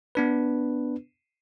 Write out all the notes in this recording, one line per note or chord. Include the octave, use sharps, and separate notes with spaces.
B3 D4 B4